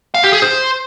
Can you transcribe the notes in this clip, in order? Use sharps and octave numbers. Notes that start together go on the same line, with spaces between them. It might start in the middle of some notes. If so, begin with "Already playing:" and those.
F5
G4
G#4
C5